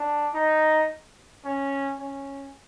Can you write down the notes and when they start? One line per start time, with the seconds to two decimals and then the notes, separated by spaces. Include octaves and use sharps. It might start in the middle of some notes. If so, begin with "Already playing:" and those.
Already playing: D4
0.34 D#4
1.45 C#4
2.00 C#4